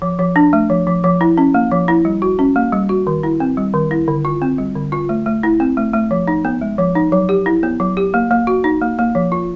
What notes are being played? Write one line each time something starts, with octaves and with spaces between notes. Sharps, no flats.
F3
F3
D4
A3
F3
F3
F3
E4
C#4
A#3
F3
E4
G3
F#4
C#4
A#3
G3
F#4
D#3
E4
C4
G3
D#3
E4
D3
F4
C4
G3
D3
F4
A3
A3
E4
C4
A3
A3
F3
D#4
B3
G#3
F3
D#4
F#3
G4
E4
B3
F#3
G4
A#3
A#3
F#4
D#4
A#3
A#3
F3
F4